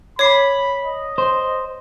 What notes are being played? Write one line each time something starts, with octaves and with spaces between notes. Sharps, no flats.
C#5 B5 D6 C7
D#5
C5